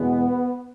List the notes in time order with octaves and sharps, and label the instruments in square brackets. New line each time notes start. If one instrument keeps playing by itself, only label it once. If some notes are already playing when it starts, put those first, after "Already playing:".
Already playing: [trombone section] E2 B2 G#3 B3